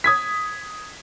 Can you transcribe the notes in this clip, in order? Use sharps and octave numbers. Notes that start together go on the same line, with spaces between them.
D#6 G#6 B6